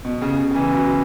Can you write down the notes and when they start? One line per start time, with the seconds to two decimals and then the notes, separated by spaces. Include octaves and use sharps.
0.04 B2
0.22 C#3
0.38 C#3
0.51 C#3
0.55 E3
0.73 F#3